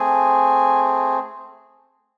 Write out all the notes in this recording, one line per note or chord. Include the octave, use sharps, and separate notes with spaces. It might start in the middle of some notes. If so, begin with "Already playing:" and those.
Already playing: A3 C4 G#4 G#5